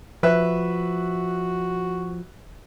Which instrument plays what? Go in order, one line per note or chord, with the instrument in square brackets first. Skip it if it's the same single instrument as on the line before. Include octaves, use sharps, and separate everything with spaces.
[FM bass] F3 [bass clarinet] F#4 [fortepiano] B4 E5 F#6